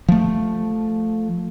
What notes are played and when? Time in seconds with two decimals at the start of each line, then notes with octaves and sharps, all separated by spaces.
0.09 F3 A3